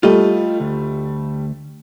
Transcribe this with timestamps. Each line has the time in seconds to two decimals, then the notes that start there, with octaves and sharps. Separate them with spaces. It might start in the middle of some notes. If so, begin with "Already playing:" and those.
0.03 G3 A3 F4 D#5
0.60 D2